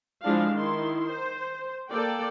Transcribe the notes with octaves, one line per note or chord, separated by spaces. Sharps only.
F3 G#3 D4 E4 F5
D#3 E4 C6
C5
A#3 A4 D5 G5